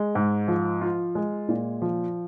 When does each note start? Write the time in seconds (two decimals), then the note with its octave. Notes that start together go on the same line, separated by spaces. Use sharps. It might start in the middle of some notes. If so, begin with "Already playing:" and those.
Already playing: G#3
0.15 G#2
0.48 F3
0.81 F4
1.15 G#3
1.49 A#2
1.82 F3